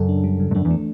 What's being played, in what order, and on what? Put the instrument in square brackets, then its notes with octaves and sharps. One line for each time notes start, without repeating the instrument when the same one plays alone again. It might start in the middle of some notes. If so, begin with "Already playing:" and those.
Already playing: [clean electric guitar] F#2 [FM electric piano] C#3 A4
[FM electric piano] D4
G3
C#3
[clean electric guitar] G2
[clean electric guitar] F#2 [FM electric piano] D4
[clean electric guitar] E2
[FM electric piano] A3